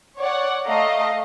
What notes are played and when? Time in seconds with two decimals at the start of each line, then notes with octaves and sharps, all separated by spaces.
0.18 C#5 D5 F#5
0.66 A3 D#5 F5 A#5